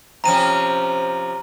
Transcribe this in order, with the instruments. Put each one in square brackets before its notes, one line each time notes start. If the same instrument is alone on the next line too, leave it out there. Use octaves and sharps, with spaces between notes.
[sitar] C3 F3 C#4 [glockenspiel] A#5 D#7